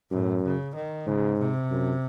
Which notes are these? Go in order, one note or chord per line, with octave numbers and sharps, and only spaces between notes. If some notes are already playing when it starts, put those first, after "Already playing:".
F#2 A2
C#3
D#3
G#2 C#3
C3
F#2